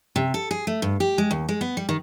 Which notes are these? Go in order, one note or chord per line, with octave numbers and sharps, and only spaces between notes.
C3
A4
G#4
A3
G2
G4
G#3
D#2
G#3
B3
G3
D#3